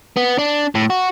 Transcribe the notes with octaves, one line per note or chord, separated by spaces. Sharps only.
B3
D4
A2
F#4